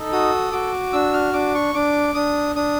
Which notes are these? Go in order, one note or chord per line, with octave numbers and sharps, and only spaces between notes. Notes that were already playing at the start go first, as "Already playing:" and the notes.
Already playing: D#4 A4
F#4 D#6
F#4 D6
D4 E6
F6
D4 D6
C#6
D4 D6
D4 D#6
D4 D#6